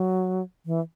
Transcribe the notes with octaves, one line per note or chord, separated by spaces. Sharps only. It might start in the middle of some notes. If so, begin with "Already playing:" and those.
Already playing: F#3
E3